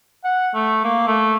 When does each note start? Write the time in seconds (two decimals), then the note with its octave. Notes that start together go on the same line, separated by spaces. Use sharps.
0.24 F#5
0.54 A3
0.84 A#3
1.08 A3